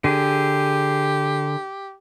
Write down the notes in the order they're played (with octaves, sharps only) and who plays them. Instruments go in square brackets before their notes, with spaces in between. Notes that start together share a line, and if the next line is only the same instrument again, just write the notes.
[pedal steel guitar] D3 G#4 [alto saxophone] G4